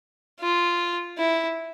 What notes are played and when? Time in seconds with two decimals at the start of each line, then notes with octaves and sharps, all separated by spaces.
0.40 F4
1.18 E4